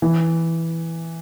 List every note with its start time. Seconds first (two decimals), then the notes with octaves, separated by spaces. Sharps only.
0.02 E3